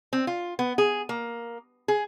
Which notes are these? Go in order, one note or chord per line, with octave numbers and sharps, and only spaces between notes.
C4
F4
B3
G#4
A#3
G#4